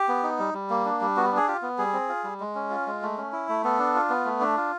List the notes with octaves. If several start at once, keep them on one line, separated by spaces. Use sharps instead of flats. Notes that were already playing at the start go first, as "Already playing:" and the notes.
Already playing: G4
B3
D#4
G3
G3
A#3
D4
G3
B3 F#4
D4 G#4
F4 G4
B3
G3 G#4
C4
F4
G3
G#3
C#4
F4
G#3
A3
C#4
E4
A3
B3 A4
D4
F4
B3
A3
D4
F4